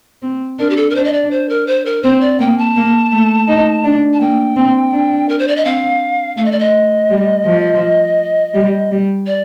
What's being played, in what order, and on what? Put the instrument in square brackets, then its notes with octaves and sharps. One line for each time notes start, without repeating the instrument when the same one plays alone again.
[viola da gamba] C4
[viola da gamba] D4 [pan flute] A#4
[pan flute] G4
A4
A#4
[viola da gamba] D4 [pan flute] C5
[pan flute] D#5
D5
C5
A#4
C5
A#4
[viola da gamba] C4 [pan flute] C5
[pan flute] D5
[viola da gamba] A#3 [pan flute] G5
[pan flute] A5
[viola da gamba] A#3
A3
D#4
D4
[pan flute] A5
[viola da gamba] A#3 [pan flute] G5
[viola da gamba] C4
D4
[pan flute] A#4
C5
D5
D#5
[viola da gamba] C4 [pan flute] F5
[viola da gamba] A3 [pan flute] F5
[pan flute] D#5
D5
D#5
[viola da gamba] G3
F3
G3
G3
[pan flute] D5